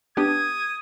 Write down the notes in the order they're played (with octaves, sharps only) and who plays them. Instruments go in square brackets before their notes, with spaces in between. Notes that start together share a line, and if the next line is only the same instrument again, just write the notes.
[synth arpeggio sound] B3 D4 G4 [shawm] D#6 [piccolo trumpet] G#6